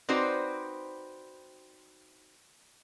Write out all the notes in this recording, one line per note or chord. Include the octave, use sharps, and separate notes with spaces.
C4 D#4 F#4 B4 C5 D5